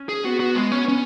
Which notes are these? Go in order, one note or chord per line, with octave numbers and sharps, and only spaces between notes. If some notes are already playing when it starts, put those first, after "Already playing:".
Already playing: C#4
G#4
B3 F#4
F#4
G#3
C#4
C#4